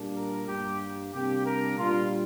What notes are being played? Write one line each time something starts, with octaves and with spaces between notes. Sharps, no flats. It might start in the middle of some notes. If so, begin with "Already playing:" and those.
Already playing: A#2 G3 A#3 D4
A#4
G2 G3 A#3 G4
C3 G3 A#3 D4 G4
A#4
A#2 G3 D4 F4